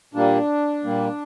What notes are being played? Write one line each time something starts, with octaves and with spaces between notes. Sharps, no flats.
A#2 G3 A#3 D4
A#2 G3 A#3